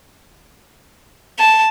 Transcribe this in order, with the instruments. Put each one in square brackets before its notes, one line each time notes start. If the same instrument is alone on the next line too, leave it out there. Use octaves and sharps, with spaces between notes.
[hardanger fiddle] A5